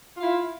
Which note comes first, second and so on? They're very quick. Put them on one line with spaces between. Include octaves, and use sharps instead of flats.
F4 F5 E4